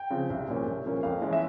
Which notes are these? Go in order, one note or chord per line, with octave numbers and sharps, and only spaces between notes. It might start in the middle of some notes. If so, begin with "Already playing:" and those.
Already playing: G5
C#3 F3 C4
C2
A#2 F3 A#3 C#4
C2
A#2 F3 A#3 C#4
F2 F5
E3 G#3 C#4
E5